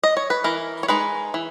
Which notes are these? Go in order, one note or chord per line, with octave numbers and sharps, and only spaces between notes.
D#5
C#5
B4
E3 A#4
C#5
G#3 D#4 B4
E3